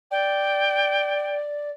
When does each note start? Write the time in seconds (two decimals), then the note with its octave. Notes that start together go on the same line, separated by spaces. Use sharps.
0.11 D5 G5